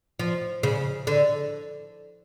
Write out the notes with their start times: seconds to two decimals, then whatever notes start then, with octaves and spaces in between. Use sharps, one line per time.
0.20 F3
0.63 C#3
1.07 D3